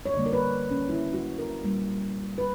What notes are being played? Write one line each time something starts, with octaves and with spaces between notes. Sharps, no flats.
C#5
D3 G3 A#3 D5
A#4
B4
C#4
E4
F#4
A#4
A#2 G3 A#3
B4